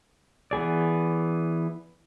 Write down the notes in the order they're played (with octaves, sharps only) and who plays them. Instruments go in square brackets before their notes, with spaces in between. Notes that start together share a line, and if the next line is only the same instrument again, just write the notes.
[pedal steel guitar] E3 B3 G#4 D5